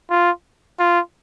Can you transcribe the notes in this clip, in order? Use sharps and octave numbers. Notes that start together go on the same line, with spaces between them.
F4
F4